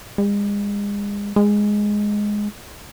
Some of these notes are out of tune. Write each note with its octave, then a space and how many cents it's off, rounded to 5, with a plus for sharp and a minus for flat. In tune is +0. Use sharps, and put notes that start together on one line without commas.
G#3 -35
G#3 +0